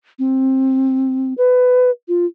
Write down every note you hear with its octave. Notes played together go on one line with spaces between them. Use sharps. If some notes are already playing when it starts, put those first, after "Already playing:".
C4
B4
F4